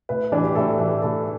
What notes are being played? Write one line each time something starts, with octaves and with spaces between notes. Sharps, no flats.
A2 B4
E3 D4
G4
A2 A4
E3
A2 A4